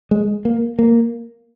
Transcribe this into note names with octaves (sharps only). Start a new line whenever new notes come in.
G#3
A#3
A#3